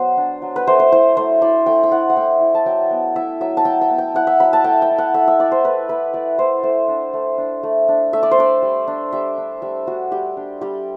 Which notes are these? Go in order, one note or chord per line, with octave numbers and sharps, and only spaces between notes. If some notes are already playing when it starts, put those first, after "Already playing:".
Already playing: F#3 B3 F#4 C5
D4
F#3
B4
A3 C5
C5
E4 C5
A3 C5
E4 D5
A3 G5
G5
E4 F#5
F#5
A3 G5
E4
A5
F#3 G5
B3
E4 E5
F#3 E5
A5
F#3 G5
G5
B3
G5
E4 F#5
E5
F#3 B5
A5
A3 G5
G5
E4
F#5
A3 E5
E5
E4 D5
C5
A3 B4
E4 B4
A3 D5
E4 C5
A3 C5
D4
A3
D4
A3
D4
A3 E5
D5
C5
D4 D5
G3
D4
G3 E5
D4
G3 E5
D4 F#4
G3 G4
D4
G3 G4